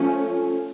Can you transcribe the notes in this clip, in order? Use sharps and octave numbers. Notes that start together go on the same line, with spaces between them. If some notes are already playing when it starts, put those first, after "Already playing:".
Already playing: F3 A3 C#4